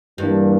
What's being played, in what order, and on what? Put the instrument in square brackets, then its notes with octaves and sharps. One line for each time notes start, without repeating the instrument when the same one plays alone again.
[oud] G2 [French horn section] E3 G3 A#3 D4